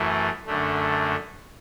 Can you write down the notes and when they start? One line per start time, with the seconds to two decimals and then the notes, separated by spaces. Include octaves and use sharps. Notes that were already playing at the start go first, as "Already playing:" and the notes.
Already playing: F#2 E3 A3
0.46 F#2 D3 A3